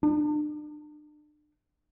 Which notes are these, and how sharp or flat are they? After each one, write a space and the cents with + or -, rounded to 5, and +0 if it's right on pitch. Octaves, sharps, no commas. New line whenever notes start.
D4 +35